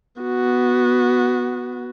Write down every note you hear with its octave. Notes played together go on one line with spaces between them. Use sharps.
B3 F#4